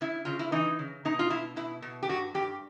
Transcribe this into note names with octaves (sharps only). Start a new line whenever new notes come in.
C#3 E4
C#3 F4
E4
E3 D#4
C#3
B2 D#4
F4
B2 E4
B2 E4
B2
G4
G2 F#4
G2 G4